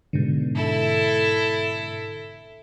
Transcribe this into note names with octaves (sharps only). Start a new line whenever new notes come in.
G#2 B2 D3
E4 A4